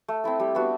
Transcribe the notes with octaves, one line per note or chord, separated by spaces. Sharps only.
A3
C4 E4 A4
G3
B3 D4 F#4